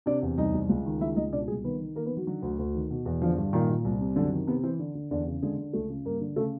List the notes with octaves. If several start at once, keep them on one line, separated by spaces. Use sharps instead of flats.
C3 D4 D5
E2
C2 D#4 D#5
C2
C#2
D#3
C#2 E4 E5
C#2 D#4 D#5
B2 D4 D5
C2 G#3 G#4
D#3 B3 B4
D#3
D#3 A#3 A#4
B3 B4
D#3
F#3 F#4
D3 F#3 F#4
D2
D2
D#3
B2
E2
D3 F3 F4
G2
A#2 D#3 D#4
A#2
C2
C3
F#2 D3 D4
D#3
C3 B3
E3 C4
D3
D3
E2 D3 D4
C#3
D3 G#3 G#4
D3
C#2 A3 A4
C#3
G2 A#3 A#4
D3
C#3 A3 A4